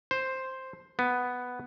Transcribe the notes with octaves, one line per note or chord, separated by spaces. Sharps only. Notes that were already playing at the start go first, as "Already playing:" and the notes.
C5
B3